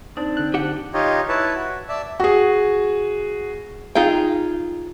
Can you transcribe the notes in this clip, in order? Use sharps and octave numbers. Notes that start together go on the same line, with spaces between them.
C4 D4 D#4
D3 F#6
G4 F#5
D#4 F4 G4 C#5 D#5
E4 B4 C#5 A5
F#4
D5 E5 A5
F#4 G#4
D#4 F4 G#4 G5